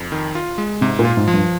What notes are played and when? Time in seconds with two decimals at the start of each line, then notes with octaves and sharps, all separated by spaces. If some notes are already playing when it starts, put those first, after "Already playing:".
Already playing: F2
0.12 D#3
0.35 F4
0.58 G#3
0.81 G#2 C3
0.99 A#2
1.05 F4
1.17 G#2
1.28 F3
1.34 G2